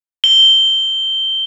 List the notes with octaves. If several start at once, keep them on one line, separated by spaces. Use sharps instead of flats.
G7